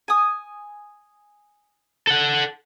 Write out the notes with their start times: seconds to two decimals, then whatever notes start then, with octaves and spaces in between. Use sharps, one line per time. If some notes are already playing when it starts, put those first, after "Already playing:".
0.08 G#5 D#6
2.07 A4 F#5